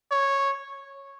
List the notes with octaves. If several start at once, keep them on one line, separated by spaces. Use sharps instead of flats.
C#5